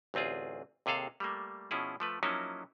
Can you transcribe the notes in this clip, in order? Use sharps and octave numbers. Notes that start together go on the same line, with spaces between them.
A1 D2 C4 F4 G#4
D#2 C3 G#4 A4 F5
G3 A3 A#3
B2 F3 C#4 E4 G#4
F3 A3 B4
F3 F#3 A#3 C#4 D#4 E4